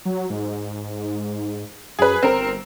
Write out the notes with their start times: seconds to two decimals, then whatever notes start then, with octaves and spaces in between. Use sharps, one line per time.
0.05 F#3
0.30 G#2
1.99 F#2 G#4 B4
2.23 G1 C4 A#4